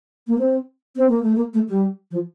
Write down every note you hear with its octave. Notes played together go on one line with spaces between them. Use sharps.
A#3
C4
C4
A#3
A3
A#3
A3
G3
F3